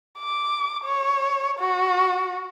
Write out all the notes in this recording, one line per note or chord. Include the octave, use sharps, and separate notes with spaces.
D6
C#5
F#4